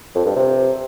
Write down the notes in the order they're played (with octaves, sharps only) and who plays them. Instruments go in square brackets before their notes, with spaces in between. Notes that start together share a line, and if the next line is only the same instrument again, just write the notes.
[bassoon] F2
G2
C3